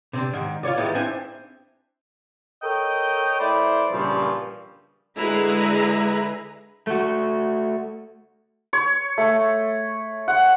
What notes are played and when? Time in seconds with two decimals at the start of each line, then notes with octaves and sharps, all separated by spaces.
0.13 C3 C4 D4
0.33 G#2 D#3
0.63 F4 A#4 C#5 D5
0.77 A2 D#3 E3 G3 G#3
0.95 C4 D4 E4 C5 E5 G#5
2.62 A4 A#4 C#5 D#5 G5
3.39 A3 E4 B4 C5 D5
3.92 G2 A#2 C#3 E3 F3 G3
5.17 D3 G#3 E4 G#4 B4 A#5
6.87 A3 F#4
8.73 C#5
9.18 A3
10.28 F#5